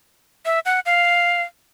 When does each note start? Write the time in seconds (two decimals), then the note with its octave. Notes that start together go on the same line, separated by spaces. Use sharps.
0.45 E5
0.66 F#5
0.86 F5